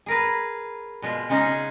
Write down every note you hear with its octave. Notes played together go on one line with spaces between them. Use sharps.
G#4 A#4 B4
B2 G#3 F4
C#3 G#3 C#4 D#4 G#4